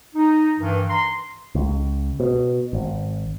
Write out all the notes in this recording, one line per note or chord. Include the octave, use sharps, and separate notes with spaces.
D#4
G2 D#3 E3
A#5 C6
C#2
B2
G#1